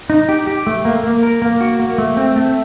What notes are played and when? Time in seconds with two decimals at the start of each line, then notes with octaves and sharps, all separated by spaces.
0.10 D#4
0.29 G4
0.47 G4
0.67 A3
0.85 A#3
1.03 A#3
1.23 A#4
1.42 A#3
1.61 F#4
1.80 A#3
1.98 A3
2.17 C4
2.36 A3